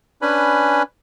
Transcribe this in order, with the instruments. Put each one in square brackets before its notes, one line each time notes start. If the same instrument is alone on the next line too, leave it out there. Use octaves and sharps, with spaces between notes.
[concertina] C#4 D4 B4 G#5 B5